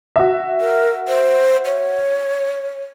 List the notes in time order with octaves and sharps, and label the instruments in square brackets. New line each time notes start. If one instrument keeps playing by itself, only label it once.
[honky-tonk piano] F#4 E5
[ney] A#4
C5
C#5